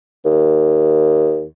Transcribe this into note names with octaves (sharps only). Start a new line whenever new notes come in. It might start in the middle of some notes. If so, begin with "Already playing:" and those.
D#2